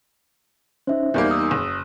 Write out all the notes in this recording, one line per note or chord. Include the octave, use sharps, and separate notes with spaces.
C#4 D#4 C5 E5
E2 G3 A#3 D#4 A#4 G6
D#6 E6
F#1